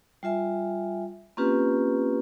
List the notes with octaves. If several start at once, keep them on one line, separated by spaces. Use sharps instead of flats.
G3 F4 E5 G#5
A#3 C4 C#4 F4 G4 B4